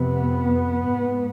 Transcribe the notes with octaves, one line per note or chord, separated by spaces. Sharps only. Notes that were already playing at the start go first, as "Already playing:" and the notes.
Already playing: F2 C3 B3
G#2